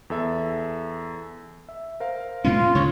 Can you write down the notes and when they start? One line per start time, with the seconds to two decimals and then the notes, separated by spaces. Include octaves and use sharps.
0.10 E2 A4 E5
1.69 E5
2.00 A#4 C5 F5
2.44 A#2 G#3 C#4 F4
2.75 D2 C#3 C#5